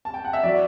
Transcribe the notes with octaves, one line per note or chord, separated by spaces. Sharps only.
A5
G5
F#5
E5
F#3 D5